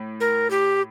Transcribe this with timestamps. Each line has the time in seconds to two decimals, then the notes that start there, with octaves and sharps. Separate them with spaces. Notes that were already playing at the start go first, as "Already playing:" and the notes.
Already playing: A2
0.20 A#4
0.51 G4